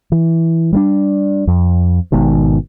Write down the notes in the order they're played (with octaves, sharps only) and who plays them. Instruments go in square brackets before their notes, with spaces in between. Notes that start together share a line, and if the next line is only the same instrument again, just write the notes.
[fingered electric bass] E3
G3 G#3 D4
F2
G#1 G#2 B2 D#3